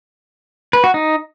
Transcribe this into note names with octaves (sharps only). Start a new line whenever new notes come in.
B4
F#4
D#4